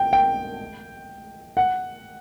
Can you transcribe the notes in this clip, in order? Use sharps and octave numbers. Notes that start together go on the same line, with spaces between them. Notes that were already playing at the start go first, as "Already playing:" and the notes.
Already playing: G5
G5
F#5